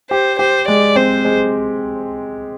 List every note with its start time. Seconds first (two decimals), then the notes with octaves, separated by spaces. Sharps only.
0.10 G4 C5
0.39 G4 C5
0.68 G#3 D5
0.96 C4 C5
1.25 G#3